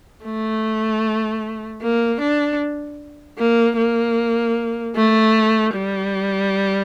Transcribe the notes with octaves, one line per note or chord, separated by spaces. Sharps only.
A3
A#3
D4
A#3
A#3
A3
G3